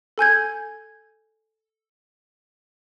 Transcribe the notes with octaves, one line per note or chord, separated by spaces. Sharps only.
A4 G#5 G6 G#6